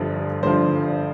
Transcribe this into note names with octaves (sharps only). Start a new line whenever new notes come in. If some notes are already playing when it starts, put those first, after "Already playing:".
Already playing: G1 G2 D3 F3
G1 G2 D3 F3 C5